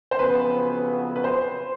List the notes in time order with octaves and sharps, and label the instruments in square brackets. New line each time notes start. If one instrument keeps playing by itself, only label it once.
[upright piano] C5
[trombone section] F2 C#3 F#3 B3 [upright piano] B4
[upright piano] B4
C5